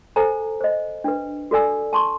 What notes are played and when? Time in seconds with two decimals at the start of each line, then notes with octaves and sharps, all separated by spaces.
0.16 A4 C5 G#5 A#5
0.60 C5 D#5
1.04 D4 B4
1.51 F#4 A4 D5 G#5 E6
1.93 A5 C6 C#6